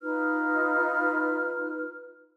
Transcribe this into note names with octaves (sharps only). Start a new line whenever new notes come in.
D#4 F4 B4 F6